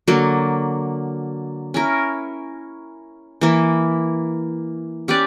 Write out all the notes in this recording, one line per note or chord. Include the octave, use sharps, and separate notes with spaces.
D3 F#3 A#3
C#4 E4 A#4
E3 A#3 E4
C#4 G4 B4 D5